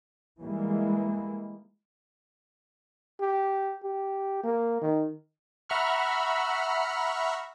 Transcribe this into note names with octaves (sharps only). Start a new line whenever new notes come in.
E3 G3 G#3 A#3
G4
G4
A#3
D#3
E5 F#5 A#5 B5 C#6 F6